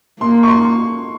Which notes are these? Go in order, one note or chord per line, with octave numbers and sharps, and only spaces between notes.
A#3 C6
C#6
C6